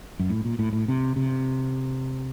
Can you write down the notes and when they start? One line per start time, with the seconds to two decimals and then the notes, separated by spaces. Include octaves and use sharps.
0.19 F#2
0.30 A2
0.45 A#2
0.59 A2
0.73 A2
0.88 C3
1.16 C3